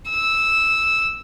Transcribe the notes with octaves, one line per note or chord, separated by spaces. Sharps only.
E6